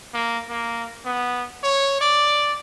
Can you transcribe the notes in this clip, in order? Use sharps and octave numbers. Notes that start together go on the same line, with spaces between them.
A#3
A#3
B3
C#5
D5